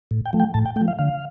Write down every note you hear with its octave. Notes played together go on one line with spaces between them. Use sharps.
A2
G5
F3 A3
G5
A2 A5
G5
A3 G5
F3
F5
D3 F5